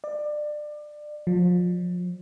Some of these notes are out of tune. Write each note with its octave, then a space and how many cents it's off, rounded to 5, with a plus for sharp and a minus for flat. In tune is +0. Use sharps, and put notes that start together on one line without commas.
D5 +25
F3 +30